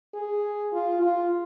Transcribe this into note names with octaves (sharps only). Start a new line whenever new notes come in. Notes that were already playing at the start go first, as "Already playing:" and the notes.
G#4
F4
F4